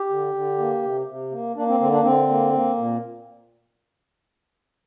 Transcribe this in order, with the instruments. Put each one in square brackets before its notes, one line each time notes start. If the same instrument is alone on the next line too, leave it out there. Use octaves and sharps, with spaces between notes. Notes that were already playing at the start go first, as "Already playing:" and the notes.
Already playing: [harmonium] G4
D3
D3
A#3
C3
C3
A#3
A#3 D4
C4
D3 C4
D4
D3 C4
A#3
A#3
A#2